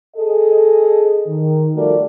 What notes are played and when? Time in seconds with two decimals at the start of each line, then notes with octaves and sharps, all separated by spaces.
0.17 G#4 A4 D#5
1.27 D#3
1.75 F3 G3 A3 F#4 A#4 D5